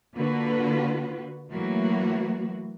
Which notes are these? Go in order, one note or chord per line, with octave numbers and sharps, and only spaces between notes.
D3 A#3 F4 F#4 B4
E3 F#3 A3 A#3 F#4